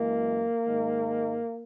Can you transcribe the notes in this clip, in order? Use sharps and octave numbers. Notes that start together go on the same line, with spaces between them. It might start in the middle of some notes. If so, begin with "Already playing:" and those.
Already playing: F#2 E3 G#3 A#3
G#2 D#3 G#3